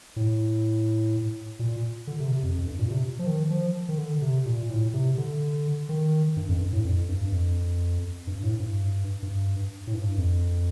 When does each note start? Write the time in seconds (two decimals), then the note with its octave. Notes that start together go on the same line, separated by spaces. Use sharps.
0.16 A2
1.59 A#2
2.07 D3
2.20 C3
2.31 C3
2.43 F2
2.55 F2
2.67 G2
2.79 A#2
2.90 C3
3.19 F3
3.27 D#3
3.50 F3
3.89 D#3
3.98 D3
4.22 C3
4.46 A#2
4.70 A2
4.94 C3
5.18 D3
5.89 D#3
6.37 G2
6.48 F2
6.60 G2
6.73 A2
6.84 F2
7.09 G2
7.32 F2
8.27 G2
8.43 A2
8.59 G2
9.22 G2
9.87 A2
9.94 G2
10.18 F2